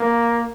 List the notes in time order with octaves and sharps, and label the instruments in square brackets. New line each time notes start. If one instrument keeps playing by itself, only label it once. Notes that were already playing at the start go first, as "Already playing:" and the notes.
Already playing: [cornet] A#3